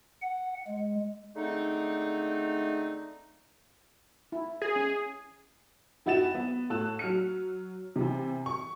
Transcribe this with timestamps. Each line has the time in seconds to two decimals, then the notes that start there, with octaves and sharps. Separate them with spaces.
0.22 F#5
0.68 G#3
1.35 D3 G#3 A3 C4 D#4
4.32 E4
4.62 G#4
4.76 C#4
6.06 F2 E4 F#4 A6 E7
6.35 B3
6.70 A2 A5 E6 F#6 E7
6.99 F#3 F6 C#7
7.96 C3 E3
8.46 C#6